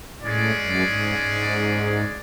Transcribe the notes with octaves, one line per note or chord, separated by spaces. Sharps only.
A2 G#3 C#4 G#4 D5
F#2
G#2
G#2